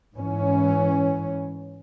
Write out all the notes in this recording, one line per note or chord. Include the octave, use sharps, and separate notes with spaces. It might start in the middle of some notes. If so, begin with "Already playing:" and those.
G#2 E3 C#4